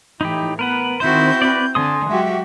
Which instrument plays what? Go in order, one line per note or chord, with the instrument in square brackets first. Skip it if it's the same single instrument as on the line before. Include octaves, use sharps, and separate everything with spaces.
[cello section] A2 E3 [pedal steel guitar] D#4 E4 G4
[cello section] B3 [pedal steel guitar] A#4 B4 F#5
[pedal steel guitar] D#3 C5 [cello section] C4 [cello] E4 F#4 [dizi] G6
[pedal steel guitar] B4 D5
[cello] D3 [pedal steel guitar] G#5 C6 D#6
[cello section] F#3 F#4 G4 [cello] G#3 [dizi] E5